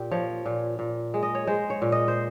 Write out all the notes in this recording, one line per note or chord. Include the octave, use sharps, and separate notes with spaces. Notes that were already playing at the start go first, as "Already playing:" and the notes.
Already playing: A#2 G4
F3 C#5
A#2
A#2
G#3
D#5
C#5
G#3 C5
C#5
A#2
D#5
C5